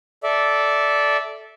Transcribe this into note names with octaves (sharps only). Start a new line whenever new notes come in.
A4 D5 E5